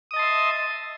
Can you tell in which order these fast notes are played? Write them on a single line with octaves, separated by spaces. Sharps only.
D#6 D#5 A5 C6 E5